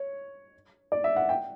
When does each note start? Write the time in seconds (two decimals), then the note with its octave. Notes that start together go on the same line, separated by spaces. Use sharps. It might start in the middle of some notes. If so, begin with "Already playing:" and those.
Already playing: C#5
0.92 D5
1.04 E5
1.16 F#5
1.29 G5